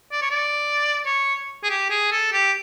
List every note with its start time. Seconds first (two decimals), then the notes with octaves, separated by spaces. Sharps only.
0.12 D5
0.22 C#5
0.30 D5
1.06 C#5
1.63 G#4
1.70 G4
1.90 G#4
2.12 A4
2.33 G4